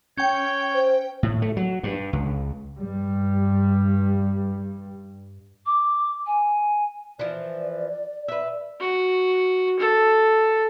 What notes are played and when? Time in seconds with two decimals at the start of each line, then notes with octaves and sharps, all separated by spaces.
0.17 C#4 C#5 G5 G6
0.74 C5
1.23 A2
1.42 A3
1.57 F#3
1.83 G2
2.13 C#2
2.80 G2 G3
5.66 D6
6.27 G#5
7.19 E3 F3 D5
8.28 B4 E5
8.80 F#4
9.79 A4